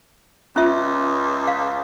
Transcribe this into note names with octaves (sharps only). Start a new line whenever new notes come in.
C#2 C#4 F4 E5
F5